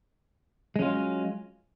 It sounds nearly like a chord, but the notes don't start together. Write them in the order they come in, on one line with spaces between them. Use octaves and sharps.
G#3 C#4 F4 F#3